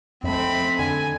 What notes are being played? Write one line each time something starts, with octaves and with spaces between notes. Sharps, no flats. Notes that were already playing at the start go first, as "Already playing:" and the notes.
F2 A3 C4 B5
D3 G#5